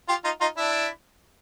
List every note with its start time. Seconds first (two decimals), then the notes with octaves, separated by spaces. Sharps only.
0.08 F4 G4
0.24 D#4 F4
0.41 D#4 F4
0.57 D4 E4